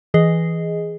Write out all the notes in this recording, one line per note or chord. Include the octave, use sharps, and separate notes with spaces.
E3 G#4 D#5